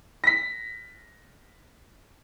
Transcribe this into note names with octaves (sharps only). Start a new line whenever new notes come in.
A#6 B6